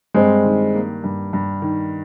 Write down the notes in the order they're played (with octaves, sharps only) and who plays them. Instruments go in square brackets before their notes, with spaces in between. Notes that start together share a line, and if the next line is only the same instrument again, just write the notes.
[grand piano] G2 [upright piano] G#3 C4
[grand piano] D#3
A#3
G2
G2
D#3